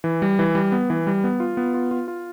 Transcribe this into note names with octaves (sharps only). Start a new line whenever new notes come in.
E3
G3
E3
G3
B3
E3
G3
B3
F4
B3
F4
F4
F4